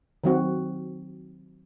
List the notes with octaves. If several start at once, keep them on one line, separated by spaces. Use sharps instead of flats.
D#3 F#3 C4 F#4